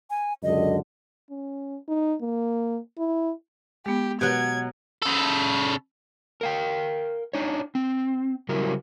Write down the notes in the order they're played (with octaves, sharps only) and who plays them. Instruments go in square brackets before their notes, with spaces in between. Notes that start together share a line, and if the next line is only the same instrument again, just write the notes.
[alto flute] G#5
[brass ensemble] C#2 F#2 D3 [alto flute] D#5
[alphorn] C#4
D#4
A#3
E4
[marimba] G#3 B3 [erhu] G4
[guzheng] B2 F#3 [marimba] G4 F#6 [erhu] G#6
[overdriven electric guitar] C#3 A4
[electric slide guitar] A#4 F5 G5
D4 D#4 C#5
C4
C#3 F#3 G3 E4 A#4